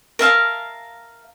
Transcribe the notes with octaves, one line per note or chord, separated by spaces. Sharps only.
A#4 E5 F5 A5